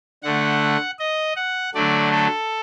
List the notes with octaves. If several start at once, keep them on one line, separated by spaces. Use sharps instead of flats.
D3 A3 F#5
D#5
F#5
D3 F#3 A3 D5
A4